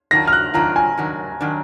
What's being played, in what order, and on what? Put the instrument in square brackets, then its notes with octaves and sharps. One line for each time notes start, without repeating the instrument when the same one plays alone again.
[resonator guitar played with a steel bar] D#3 F#3 D4 F4 [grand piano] A#6
[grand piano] F6
F#6
[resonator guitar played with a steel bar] D#3 F#3 D4 F4 [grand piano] A#5
[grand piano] G#5
[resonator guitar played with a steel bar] D#3 F#3 D4
D#3 F#3 D4